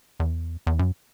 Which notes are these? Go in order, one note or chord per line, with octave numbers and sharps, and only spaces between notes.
E2
E2
F#2